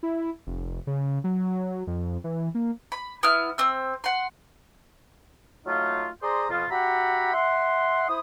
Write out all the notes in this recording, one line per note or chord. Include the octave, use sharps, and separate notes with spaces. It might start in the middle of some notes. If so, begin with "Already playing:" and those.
E4
F1
C#3
F#3
F2
E3
A#3
B5
B3 E4 F6
C4 E6
F#5 C6
F#3 A3 D#4 F4
G#4 C5 D5 A#5 C6 D#6
F2 B2 F3 F4
F#4 G4 E5 F#5 A#5 B5
E5 F#5 C6
E4 C5 D#6